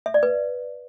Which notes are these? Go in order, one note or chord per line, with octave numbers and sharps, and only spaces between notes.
E5
D5
B4